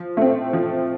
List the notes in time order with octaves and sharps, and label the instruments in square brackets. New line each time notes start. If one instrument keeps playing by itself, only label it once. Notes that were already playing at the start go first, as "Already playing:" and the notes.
Already playing: [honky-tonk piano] F3
A3 C4
F3